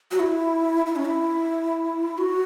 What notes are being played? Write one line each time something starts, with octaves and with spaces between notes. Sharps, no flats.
F#4
E4
E4
C#4
E4
F#4